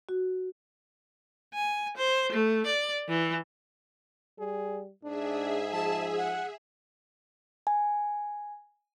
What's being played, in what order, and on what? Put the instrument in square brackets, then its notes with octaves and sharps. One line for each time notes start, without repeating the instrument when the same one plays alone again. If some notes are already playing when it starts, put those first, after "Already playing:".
[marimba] F#4
[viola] G#5
C5
A3
D5
E3
[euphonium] G3 [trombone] G#4
[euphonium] G#2 [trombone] D4 [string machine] G#4 E5
[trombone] F3 [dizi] A5
[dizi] F#5
[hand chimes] G#5